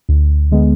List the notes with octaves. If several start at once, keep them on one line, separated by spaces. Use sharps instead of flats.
D2
D3 G#3 B3